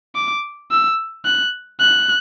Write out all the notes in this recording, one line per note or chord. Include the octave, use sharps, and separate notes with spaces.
D6
E6
F#6
F#6